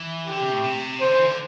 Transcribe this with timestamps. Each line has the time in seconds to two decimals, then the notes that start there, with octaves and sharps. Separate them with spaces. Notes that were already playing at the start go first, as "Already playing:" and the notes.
Already playing: E3
0.27 D3 G4
0.40 C3
0.52 A2
0.64 C3
1.01 D3 C5
1.13 E3
1.24 D3